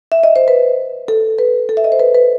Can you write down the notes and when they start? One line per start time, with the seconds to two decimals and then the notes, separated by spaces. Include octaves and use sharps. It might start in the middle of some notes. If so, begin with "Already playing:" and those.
0.12 E5
0.23 D#5
0.36 C5
0.48 B4
1.08 A4
1.39 B4
1.69 A4
1.77 E5
1.84 D#5
1.92 C5
1.99 B4
2.15 B4